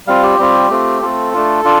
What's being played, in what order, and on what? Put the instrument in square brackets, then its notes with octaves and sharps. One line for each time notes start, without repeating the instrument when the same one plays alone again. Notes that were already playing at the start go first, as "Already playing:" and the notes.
[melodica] G3 C4 F4 F5
G4
G3 C4 F4
A3 C4 F4
A3 C4 F4 A4
A3 D4 F4
D4 F4